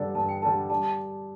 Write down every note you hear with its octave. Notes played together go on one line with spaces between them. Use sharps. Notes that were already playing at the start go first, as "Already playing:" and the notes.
Already playing: G2 D3 G3 D4 A4
G2 A5
G5
D3 G3 D4 A4 A5
G3 A5
A5